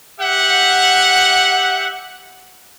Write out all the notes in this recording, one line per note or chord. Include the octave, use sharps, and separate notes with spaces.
G4 E5 F#5